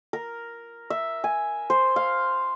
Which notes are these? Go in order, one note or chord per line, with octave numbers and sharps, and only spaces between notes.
A#4
E5
G#5
C5
F5